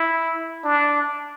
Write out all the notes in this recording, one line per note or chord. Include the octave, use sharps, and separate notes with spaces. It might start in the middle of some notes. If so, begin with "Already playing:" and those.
Already playing: E4
D4